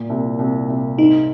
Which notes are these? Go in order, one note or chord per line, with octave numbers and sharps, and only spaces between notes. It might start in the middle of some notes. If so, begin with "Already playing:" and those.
Already playing: A#2
C2
C2
C2
G#2 D#4